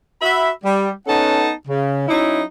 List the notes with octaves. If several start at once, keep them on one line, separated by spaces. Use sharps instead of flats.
F#4 E5 B5
G3
B3 C#4 D#4 A4 F#5 A5
C#3
F#3 C#4 D#4 E4